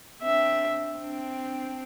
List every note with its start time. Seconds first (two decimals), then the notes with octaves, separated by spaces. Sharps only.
0.22 C4 D4 E5
0.97 C4 D4